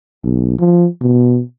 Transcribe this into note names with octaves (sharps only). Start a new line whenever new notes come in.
B1
F3
B2